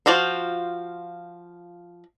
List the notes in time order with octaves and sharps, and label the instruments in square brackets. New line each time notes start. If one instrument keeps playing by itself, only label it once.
[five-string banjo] F3 F4 F#4 C5